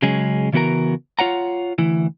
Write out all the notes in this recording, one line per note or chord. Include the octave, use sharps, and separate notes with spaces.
C#3 F#3 G#3 C#4 G#4
C#3 E3 B3 F#4 A#4 A#5
F4 C#5 F#5 A#5
D2 E3 E4